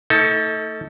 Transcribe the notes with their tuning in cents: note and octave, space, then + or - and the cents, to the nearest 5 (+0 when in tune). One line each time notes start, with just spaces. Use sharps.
A3 +30 D#4 +40 A4 +0